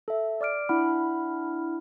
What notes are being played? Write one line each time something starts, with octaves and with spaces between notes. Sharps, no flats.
A4 E5
D5 D6 F6 D7
D4 E4 F#5 B5 F6